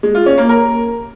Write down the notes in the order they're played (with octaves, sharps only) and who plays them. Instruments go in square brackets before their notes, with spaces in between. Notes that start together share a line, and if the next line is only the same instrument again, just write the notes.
[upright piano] G#3
F4
C#4
A#3
A#4